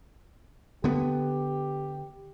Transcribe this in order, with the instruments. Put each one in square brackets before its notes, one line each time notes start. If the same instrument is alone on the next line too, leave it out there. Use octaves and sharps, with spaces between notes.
[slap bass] D3 B3 [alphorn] G4